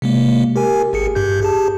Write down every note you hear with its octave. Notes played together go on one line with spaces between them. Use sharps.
C3 G#3 A#3
G4 A#4 G#5
G#1 G#4 C#7
G2 G4 G6
G4 G#4 A5